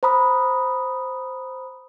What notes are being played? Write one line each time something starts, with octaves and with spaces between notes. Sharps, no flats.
C5 A#5 B5 D#6